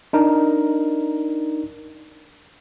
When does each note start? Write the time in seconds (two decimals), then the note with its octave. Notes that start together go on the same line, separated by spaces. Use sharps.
0.13 D4 D#4 A#4